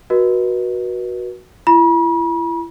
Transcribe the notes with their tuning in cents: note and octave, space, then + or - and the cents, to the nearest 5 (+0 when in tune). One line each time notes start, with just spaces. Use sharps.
F#4 +0 B4 -40 D#5 +0
E4 +35 B5 -45